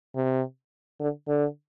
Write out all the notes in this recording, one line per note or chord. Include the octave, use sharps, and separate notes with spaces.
C3
D3
D3